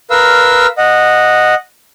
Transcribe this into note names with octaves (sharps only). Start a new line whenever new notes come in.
A#4 B4 F5 E6
D#5 F#5